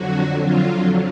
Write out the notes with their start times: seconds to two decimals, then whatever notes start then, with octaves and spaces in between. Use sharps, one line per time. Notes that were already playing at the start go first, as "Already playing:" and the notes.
Already playing: F2 D3 F#3 F#4
0.43 F4